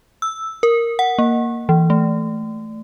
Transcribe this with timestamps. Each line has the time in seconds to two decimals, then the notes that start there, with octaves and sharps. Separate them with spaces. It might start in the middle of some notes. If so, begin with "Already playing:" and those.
0.22 E6
0.63 A#4
0.99 F#5
1.18 A#3
1.69 E3
1.90 A3